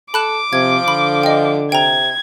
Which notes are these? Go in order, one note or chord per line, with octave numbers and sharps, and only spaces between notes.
A4 B5 D6 F#6 E7
C3 F3 G#6
D3 B5
D#5 G5
C3 G5 A#5 G#6